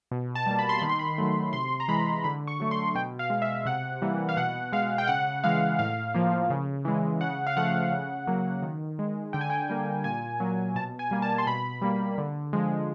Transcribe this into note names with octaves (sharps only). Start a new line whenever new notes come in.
B2
A5
G3 A#3
B5
C6
D#3 B5
C6
B5
F#3 A3
C3 C6
A#5
E3 G#3 B5
D3 B5
C#6
F#3 A3
C6
B2 G5
F5
G#3
E5
C3 F#5
E3 G3 A#3
F5
B2 F#5
G#3 F5
G5
C#3 F#5
E3 G#3 F5
A2 F5
F3 A#3
C#3
E3 G#3
C#3 F#5
F5
F3 A3 F#5
C#3
F#3 A#3
D#3
G#3
D3 G5
G#5
G5
G3 A#3
A#2 G#5
F#3 A#3
B2 A5
G#5
G3 A#3
A5
C6
B2 B5
G3 A#3
D3
F3 G#3